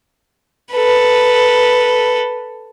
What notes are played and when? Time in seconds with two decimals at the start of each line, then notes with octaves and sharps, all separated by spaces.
0.73 A4 B4